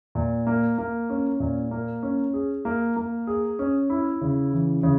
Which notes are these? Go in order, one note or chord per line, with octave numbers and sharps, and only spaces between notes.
A#2
A#3
A#3
C#4
A#2
A#3
C#4
G#4
A#3
A#3
G#4
C#4
E4
C#3
E3
C#3